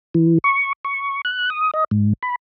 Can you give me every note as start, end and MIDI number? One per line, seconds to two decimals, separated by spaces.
0.14 0.38 52
0.44 0.73 85
0.85 1.21 85
1.25 1.50 90
1.50 1.71 87
1.74 1.84 75
1.91 2.13 44
2.22 2.35 83